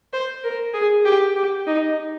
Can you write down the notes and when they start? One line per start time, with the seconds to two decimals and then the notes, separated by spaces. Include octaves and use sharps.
0.13 C5
0.44 A#4
0.74 G#4
1.05 G4
1.36 G4
1.67 D#4